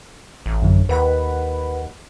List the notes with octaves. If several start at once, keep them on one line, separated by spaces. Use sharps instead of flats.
A1
F#2 D3
D#2 B4 F#5 B5